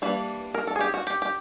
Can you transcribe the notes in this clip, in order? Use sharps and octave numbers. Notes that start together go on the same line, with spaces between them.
E3 G3 A#3 D4 B4
A#4
A4
G#4
G4
F#4
G4
G4